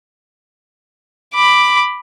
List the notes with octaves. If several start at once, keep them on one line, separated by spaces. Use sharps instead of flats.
B5 D6